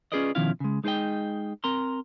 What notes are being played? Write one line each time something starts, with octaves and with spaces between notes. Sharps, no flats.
C#4 F4 G#4 B4 D5 D#5
B2 D#3 F3 C#4 E4 F5
C#3 G#3
G#3 D#4 G#4 A#4 D#5 G5
C4 A#4 A#5 C6